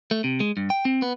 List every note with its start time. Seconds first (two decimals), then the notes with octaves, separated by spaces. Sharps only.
0.11 A3
0.24 C3
0.40 G#3
0.57 G2
0.70 G5
0.85 C4
1.02 B3